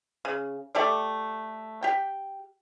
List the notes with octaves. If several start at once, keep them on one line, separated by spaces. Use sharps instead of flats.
C#3
A3 G4 A4 D5
G4 G5